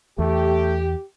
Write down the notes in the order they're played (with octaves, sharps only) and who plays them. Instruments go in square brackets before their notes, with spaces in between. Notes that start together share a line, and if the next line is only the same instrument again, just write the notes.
[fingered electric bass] E2 [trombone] A3 [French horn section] G4